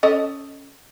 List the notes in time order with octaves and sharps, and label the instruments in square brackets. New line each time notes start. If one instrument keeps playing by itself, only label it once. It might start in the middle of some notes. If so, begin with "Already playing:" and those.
[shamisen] C#4 A4 D#5